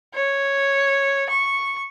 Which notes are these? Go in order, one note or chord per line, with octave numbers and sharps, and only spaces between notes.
C#5
C#6